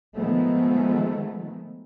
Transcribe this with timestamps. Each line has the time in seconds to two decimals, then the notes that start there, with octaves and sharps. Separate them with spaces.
0.15 D#3 F3 G#3 A3 B3